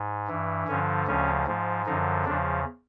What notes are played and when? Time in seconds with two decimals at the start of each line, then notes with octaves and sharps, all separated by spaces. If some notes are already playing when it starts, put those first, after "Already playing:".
Already playing: G#2
0.28 G2 E3
0.67 G2 D3 F3 C#4
1.07 D2 C#3 F3 C#4
1.47 G#2 F3
1.86 F#2 D3 F3 D#4
2.25 E2 C#3 F3 D4